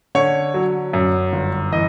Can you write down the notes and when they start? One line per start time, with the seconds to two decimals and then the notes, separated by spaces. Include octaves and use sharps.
0.15 D3 C#5
0.54 F#3
0.93 F#2
1.33 G1
1.72 E3 D#5